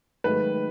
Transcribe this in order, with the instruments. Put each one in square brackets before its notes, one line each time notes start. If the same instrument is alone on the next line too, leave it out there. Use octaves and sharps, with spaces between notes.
[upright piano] G#2 D#3 F#3 A3 [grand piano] B4